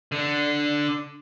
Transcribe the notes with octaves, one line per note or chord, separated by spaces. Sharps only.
D3